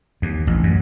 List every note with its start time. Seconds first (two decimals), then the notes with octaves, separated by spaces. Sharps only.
0.22 D#2
0.47 A1
0.63 F#2